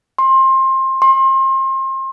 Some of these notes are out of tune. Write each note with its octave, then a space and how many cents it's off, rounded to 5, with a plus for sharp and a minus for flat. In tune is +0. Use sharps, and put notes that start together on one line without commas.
C6 +20
C6 +30